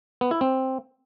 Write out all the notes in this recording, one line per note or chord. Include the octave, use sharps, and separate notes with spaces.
B3
E4
C4